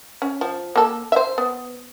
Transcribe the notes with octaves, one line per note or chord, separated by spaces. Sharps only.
C#4
F3
A#3 A4
C5 E5
B3